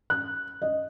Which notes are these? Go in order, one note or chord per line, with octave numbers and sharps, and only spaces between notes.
F#6
D#5